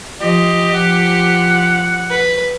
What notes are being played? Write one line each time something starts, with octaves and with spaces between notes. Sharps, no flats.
F3 G4 D#5
F3 F#5
B4